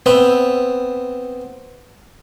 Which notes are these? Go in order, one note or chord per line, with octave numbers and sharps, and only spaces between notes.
B3 C4 E5 B5